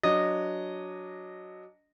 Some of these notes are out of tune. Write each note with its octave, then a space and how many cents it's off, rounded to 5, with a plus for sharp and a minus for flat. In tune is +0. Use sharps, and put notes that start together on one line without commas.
F#3 +0 D4 -15 D#5 -15